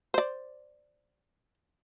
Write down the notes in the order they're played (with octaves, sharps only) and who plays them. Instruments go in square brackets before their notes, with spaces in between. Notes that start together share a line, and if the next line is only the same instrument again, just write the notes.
[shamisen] C5 D5